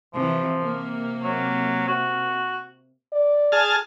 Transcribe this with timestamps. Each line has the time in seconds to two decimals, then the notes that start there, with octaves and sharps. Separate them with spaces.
0.14 C3 E3 F3
0.59 C3 A#3
1.23 F#3
1.88 F#4
3.13 D5
3.52 G#4 A5 F6